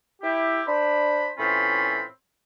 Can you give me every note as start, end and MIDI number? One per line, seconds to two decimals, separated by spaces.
0.22 0.61 64
0.22 0.61 67
0.66 1.31 62
0.66 1.31 72
0.66 1.31 83
1.37 2.01 45
1.37 2.01 52
1.37 2.01 60
1.37 2.01 61
1.37 2.01 65
1.37 2.01 83